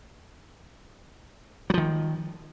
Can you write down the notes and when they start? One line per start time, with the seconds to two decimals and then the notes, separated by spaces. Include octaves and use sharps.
1.70 F#3
1.74 F3
1.78 D#3